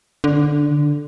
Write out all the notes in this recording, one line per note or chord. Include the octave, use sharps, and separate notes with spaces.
D3